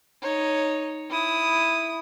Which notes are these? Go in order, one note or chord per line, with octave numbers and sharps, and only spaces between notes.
D#4 C#5
E4 D#6